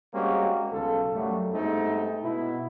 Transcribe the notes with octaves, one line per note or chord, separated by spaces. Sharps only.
G3 G#3 A#3 C4 C#4 F#4
B1 C#3 F4 A4
F#2 F#3 G3 A3
G2 G#3 A3 B3 C4 D#4
B2 E4